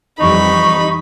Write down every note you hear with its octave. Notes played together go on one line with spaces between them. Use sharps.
F2 E3 G3 D#4 B5 C#6